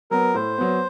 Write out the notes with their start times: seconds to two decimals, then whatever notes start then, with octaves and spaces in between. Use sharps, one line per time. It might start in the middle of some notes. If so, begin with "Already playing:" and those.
0.11 F#3 B3 A#4
0.34 A2 C5
0.58 F#3 B3